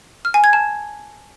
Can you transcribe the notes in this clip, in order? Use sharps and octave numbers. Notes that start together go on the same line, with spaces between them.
F6
G#5
G#6
A5